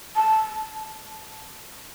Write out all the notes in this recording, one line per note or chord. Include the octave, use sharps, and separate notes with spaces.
A5